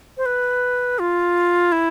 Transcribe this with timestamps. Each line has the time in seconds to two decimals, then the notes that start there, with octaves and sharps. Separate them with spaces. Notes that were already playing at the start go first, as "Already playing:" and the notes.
0.17 C5
0.26 B4
0.99 F4
1.72 E4